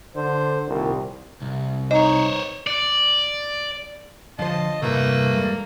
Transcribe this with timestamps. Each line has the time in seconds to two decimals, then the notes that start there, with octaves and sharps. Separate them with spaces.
0.15 D3 C5
0.68 C2 A#2 D#3
1.42 C2
1.91 D#4 C5 C#5 D#5
2.67 D5
4.39 D3 F3 F4 C5 D#5 A5
4.82 E2 G2 C3 A3 A#3 E4 B4
5.37 G#3 A4 D5